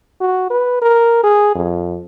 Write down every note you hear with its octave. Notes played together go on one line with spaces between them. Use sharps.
F#4
B4
A#4
G#4
F2